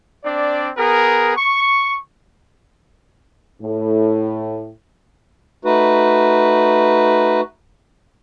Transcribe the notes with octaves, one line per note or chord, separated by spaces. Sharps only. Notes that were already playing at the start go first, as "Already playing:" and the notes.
C4 D4 D5
B3 G#4 A#4
C#6
A2
A3 D#4 F#4 B4